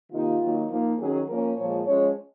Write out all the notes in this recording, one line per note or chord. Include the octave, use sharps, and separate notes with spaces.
C3 D#3 A#3 D#4 F4
D#3 F#3 A#3 D#4
F3 A#3 D#4 F4
D#3 F#3 C#4 G#4
F3 A#3 C#4 A#4
A#2 F3 G#3 C#5
F3 G#3 C#4 C#5